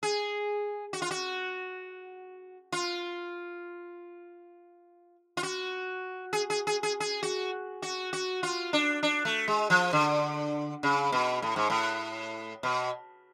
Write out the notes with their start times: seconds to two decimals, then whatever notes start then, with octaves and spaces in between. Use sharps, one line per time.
0.03 G#4
0.93 F#4
1.02 F4
1.11 F#4
2.72 F4
5.37 F4
5.43 F#4
6.33 G#4
6.50 G#4
6.67 G#4
6.83 G#4
7.00 G#4
7.23 F#4
7.82 F#4
8.13 F#4
8.43 F4
8.73 D4
9.03 D4
9.25 A3
9.48 G#3
9.70 F3
9.93 D3
10.83 C#3
11.12 B2
11.42 A2
11.56 G#2
11.70 A2
12.63 B2